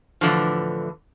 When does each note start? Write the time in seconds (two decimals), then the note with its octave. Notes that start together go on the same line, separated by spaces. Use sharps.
0.21 A2 D3 E3 F3